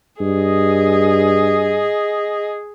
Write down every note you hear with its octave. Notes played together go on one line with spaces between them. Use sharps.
G2 G#4 D#5